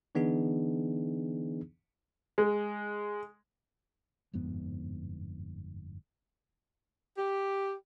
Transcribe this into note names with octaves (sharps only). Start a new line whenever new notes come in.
D3 E3 B3 D4 D#4 G#4
G#3
G1 F2 G#2 B3
G4